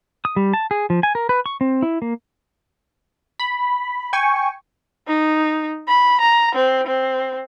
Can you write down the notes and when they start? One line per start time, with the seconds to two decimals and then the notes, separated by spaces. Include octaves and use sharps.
0.25 D#6
0.36 G3
0.53 A5
0.71 G#4
0.90 F3
1.03 G#5
1.15 A#4
1.29 B4
1.46 C#6
1.61 C4
1.83 E4
2.02 A#3
3.39 B5
4.13 G5 G#5 C#6
5.08 D#4
5.88 B5
6.21 A#5
6.55 C4
6.87 C4